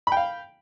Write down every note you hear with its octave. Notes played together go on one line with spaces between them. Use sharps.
F5 G5 B5